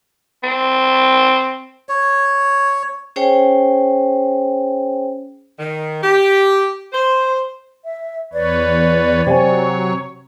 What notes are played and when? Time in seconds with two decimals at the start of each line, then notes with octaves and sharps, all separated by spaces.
0.43 C4
1.89 C#5
3.16 C#4 G#4 C5 C#5 G5 G#5
5.59 D#3
6.02 G4
6.93 C5
7.85 E5
8.33 E2 B4 C#5 D5
9.26 C3 F#3 C#5 F5 G#5